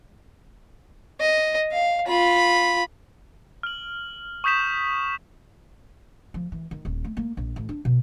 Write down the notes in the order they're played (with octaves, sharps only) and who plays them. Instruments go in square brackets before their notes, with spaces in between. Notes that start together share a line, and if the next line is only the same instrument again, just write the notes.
[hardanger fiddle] D#5
F5
F4 B5
[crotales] F6 F#7
C#6 D#6 G6 B6 E7
[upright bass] F3
E3
D#3
D#1
A3
A#3
A#1
A1
D4
B2